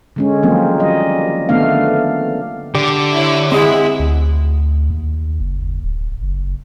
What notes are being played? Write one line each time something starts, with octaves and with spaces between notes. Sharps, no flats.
D3 G#3 C#4
D#3 F3 F#3 A#3 C4
G3 D#5
D3 D#3 A3 B3 D4 F5
D3 G4 D5
E4 C#5
G#3 C4 E4 G#4 D#5 F#5
D2
D#2
F#1
D1
F#1